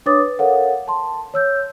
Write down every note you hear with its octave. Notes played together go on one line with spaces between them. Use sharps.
D4 B4 C#5 D6 D#6 A6
B4
A4 A#4 C#5 F5 F#5
A5 C6
C#5 E6 G6